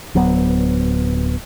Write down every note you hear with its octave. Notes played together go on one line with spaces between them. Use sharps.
D1 F#3 B3